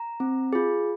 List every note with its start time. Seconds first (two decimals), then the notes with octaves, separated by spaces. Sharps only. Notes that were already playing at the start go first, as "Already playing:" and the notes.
Already playing: A#5
0.20 C4
0.53 F4 G#4